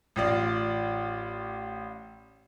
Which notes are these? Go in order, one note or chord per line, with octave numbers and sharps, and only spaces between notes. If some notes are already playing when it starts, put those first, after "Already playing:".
A1 F4 D5